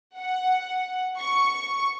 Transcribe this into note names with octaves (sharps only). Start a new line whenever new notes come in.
F#5
C#6